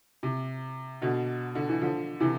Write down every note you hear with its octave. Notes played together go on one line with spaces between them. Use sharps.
C3
B2 D3
D3
E3
D3 F3
C3 E3